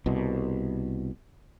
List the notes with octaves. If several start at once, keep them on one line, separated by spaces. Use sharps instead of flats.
C2 B2